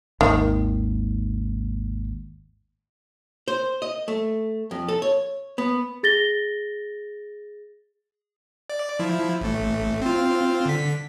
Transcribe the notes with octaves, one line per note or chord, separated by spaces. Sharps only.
G#1 D#2 D#3
C5
D#5
A3
F2
A4
C#5
B3
G#4 A6 A#6 G7
D5
F3 E4
A1 A3
C4 F4
D3 B6